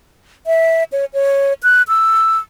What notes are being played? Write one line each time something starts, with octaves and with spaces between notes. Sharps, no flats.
E5
C#5
C#5
F#6
E6